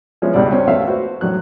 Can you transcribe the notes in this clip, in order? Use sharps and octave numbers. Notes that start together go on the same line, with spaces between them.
F3 G#3 B3 C#4 E4
C#2 G2 B2 D5
C4 C#4 F#4
A3 B3 C#4 E5 F5
F#4 B4 C5
A2 F#3 F#6